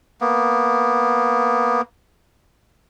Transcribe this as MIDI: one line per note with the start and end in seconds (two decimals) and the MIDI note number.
0.21 1.81 58
0.21 1.81 59